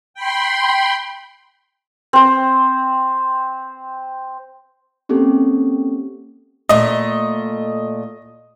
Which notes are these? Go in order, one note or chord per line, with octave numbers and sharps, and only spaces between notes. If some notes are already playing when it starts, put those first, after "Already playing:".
G5 B5 C6
C4 C5
A#3 C4 C#4 G4 A4
A#2 A3 D#5